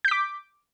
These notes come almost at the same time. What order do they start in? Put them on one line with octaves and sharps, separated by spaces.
G6 B6 D6